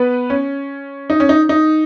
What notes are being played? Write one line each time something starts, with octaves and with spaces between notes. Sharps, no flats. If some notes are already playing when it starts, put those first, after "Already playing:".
Already playing: B3 B4
C#4
D#4
C#4
D#4
D#4